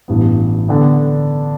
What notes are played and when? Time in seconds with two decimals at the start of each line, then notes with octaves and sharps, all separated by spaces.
0.08 A1 G2 G3 B3
0.68 D3 B3 D4